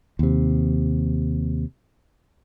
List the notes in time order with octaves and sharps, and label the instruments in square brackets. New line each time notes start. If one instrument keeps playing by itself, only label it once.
[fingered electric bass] D#2 C3